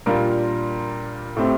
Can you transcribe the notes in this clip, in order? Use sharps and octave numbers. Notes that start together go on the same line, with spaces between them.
A#2 G3 D4 F4 A#4
A2 A3 C4 G4